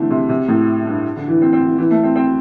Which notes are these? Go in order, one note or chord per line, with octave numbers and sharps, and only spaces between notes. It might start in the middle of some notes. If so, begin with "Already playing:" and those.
Already playing: D3 E3 A3 C4
C3
C3
A2
G2
D3
E3
C4
C4
E3
E3
A3
C4
C4